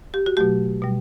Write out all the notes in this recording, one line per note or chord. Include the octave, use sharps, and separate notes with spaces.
G4
F#4
B2 F#3 A3 G4
B2 G3